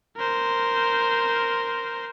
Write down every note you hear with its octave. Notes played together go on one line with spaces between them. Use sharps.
A#4 C5